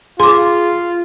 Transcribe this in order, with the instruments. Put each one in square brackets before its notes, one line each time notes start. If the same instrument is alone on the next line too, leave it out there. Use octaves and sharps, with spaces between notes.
[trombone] F4 [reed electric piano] G#4 [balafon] C6 D6